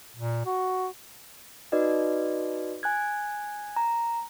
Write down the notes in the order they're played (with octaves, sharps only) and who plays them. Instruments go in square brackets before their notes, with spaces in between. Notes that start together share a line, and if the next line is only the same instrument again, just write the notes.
[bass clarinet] A#2
F#4
[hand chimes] D#4 F#4 B4 D5 D#5
G#5 F#6 G#6
A#5